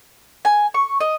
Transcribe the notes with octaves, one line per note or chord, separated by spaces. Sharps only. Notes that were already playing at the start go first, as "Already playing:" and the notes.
G#5
C#6
D#5